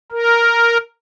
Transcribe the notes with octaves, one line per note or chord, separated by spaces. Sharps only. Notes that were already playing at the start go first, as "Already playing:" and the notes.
A#4